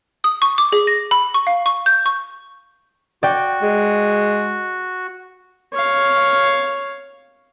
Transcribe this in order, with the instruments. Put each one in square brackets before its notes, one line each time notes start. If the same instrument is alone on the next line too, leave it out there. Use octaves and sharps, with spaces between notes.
[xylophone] D#6
C#6
D6
G#4
A#6
B5
C#6
F5
C#6
G6
C#6
[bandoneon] F#4 [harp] D5 G5
[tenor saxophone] G#3
[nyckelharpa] C#5 F5